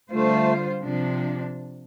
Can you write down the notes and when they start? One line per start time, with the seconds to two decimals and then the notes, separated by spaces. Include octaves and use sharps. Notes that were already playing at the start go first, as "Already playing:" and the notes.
0.11 D3 G3 A3 F4 C5
0.82 C3 F3 D4